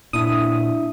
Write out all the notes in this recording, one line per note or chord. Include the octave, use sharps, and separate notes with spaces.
A#2 D4 E4 E5 D#6